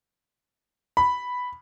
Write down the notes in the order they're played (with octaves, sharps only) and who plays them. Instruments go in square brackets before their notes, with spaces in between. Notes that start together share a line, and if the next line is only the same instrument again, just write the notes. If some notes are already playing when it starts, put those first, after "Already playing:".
[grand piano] B5